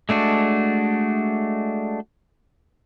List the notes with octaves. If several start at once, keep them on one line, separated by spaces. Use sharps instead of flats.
G#3 A3 D4 F#4